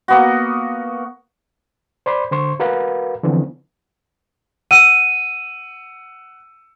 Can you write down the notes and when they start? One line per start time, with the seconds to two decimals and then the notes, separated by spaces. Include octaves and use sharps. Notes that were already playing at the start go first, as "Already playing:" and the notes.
0.08 A#3 B3 F#4
2.06 C5 D5 B5 C6
2.31 D3 C5 C6 C#6
2.60 F#4 A#4 B4 F5 F#5
3.23 D3 E3 F3 B3 C4
4.71 F#5 E6 D#7